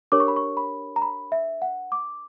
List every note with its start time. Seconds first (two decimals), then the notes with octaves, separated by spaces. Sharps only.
0.12 D4 G4 A#4 C#5 D6
0.20 C#6
0.28 B5
0.36 C#6
0.57 B5
0.96 A#5
1.02 B5
1.32 E5
1.62 F#5
1.92 D6